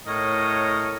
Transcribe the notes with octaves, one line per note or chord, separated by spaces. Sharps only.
A2 A#4 C#5 D#5